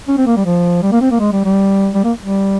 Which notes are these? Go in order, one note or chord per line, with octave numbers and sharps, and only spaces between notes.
C#4
C4
A#3
G3
F3
G3
A#3
C4
A#3
G#3
G3
G3
G3
A#3
G3